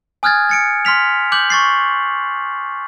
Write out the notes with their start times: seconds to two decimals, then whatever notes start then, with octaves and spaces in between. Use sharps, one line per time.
0.23 G#5 D#6 F6 F#6 G#6 A6
0.49 A6 C#7 D7
0.85 C6 F6 B6 F7
1.32 D6 F#6 G6 F#7
1.50 C#6 A6 C7